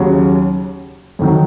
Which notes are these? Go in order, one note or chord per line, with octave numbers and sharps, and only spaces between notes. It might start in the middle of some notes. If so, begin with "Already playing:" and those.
Already playing: D#2 C#3 F#3
F2 D#3 F#3